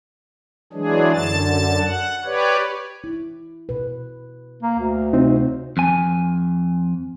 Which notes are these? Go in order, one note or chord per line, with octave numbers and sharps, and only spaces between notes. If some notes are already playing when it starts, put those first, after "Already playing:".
E3 F#3 G#3 D4 G#4
F#2 D3 A5 A6
F#5
G4 B4 C#5 D5
E4
B2 B4
A#3
D2
C3 C4 D#4 F4 C#5
F2 G#5